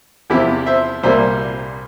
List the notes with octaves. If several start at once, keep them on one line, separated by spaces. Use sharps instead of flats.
E2 C3 F3 E4 G4
C5 E5
C2 A#2 G3 A#3 C5 E5